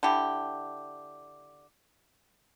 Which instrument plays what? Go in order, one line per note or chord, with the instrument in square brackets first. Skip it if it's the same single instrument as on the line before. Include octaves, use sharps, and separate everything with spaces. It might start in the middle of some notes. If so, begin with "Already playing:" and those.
[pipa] D3 E4 G4